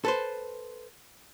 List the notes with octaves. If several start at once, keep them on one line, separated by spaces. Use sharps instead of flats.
A4 B4 C5